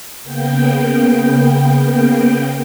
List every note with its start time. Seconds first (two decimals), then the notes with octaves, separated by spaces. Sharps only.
0.23 C#3 A#3 B3 G5